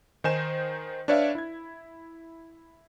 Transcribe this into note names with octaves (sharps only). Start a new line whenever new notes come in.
D#3 D#4 C5 G#5 E7
D4 B4 C#5 D5 E5 F5
E4 G#6